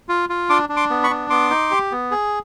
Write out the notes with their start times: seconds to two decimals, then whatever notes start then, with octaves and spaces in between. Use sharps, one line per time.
0.09 F4
0.29 F4
0.49 D4 C6 D6
0.69 D4
0.76 C6 D6
0.90 B3
1.03 B5 C#6
1.10 D4
1.30 B3 C6 D6
1.50 D#4
1.71 G4
1.92 B3
2.11 G#4